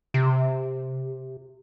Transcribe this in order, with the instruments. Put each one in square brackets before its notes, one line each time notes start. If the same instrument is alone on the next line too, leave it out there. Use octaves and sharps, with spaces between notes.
[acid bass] C3